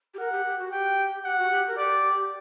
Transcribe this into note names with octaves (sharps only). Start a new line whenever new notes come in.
G4
A#4 F#5
G4
G4
F#4
G4 G5
G4 F#5
F#4
G4
A#4
G4 D5